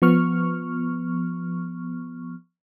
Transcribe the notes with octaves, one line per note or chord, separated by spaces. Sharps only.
F3 B3 C#6 F6